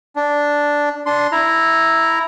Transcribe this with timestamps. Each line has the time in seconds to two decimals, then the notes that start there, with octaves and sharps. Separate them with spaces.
0.16 D4
1.06 D4 C6
1.32 E4 A#5